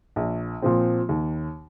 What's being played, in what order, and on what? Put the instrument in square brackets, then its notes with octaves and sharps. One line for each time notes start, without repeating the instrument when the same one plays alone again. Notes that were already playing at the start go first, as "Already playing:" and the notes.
[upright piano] A#1
A#2 F3 C4
D#2